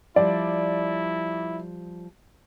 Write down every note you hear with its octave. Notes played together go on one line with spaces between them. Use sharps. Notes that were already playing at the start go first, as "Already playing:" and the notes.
F3 G3 E4 D5